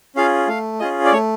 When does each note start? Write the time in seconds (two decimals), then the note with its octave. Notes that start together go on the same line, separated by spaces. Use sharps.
0.16 C#4 F4 G#4 F5
0.48 A3 F5
0.80 C#4 F4 G#4 D#5
1.05 D5
1.13 A3 C#5